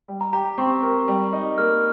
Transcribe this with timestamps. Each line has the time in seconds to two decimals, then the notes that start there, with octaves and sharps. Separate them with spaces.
0.08 G3
0.21 A#5
0.33 G4 A#5
0.58 C4 C#6
0.82 A#4
1.08 G3
1.33 D#4
1.58 A#3 F6